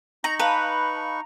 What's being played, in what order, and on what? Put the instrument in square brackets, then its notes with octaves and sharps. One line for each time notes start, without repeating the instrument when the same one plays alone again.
[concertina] D#4 C#6 [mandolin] A#5 [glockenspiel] A#6 [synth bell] F#7
[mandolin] B4 [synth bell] F5 A5 [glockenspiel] A#5 F7